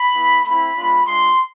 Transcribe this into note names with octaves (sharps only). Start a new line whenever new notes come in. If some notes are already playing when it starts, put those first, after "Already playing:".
Already playing: B5
B3 E4
A3 C4 E4 B5
G#3 B3 D4 F4
G#3 D4 F4 C6